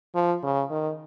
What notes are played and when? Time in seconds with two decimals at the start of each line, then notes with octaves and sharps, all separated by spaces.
0.15 F3
0.43 C#3
0.71 D#3